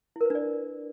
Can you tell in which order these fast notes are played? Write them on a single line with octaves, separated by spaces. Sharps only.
E4 A#4 B4 D4 D5